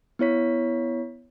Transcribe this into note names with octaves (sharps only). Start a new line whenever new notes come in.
B3 E4 C#5 B6